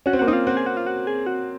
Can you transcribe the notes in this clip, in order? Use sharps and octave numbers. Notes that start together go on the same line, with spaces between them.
C#4 F#4
C4
A#3 F#4
C4 D#4
F4
C4 F#4
G#4
F#4
F4
F#4
G#4
F#4